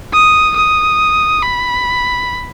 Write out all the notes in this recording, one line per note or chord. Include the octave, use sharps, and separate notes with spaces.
D#6
D#6
B5